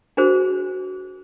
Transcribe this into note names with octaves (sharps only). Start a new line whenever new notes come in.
D4 F#4 G#4 A#4 C5